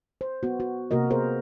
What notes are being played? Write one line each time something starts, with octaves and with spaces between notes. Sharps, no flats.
C5
B3 F#4
F#4
C3 A#3 F#4 A#4 D#5
B3 G#4 A#4 C5